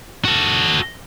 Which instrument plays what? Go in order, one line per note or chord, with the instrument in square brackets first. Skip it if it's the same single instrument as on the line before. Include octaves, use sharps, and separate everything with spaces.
[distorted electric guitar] F#4 A4